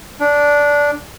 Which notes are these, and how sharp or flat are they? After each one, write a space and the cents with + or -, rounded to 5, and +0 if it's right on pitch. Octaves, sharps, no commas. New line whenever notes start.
D4 -10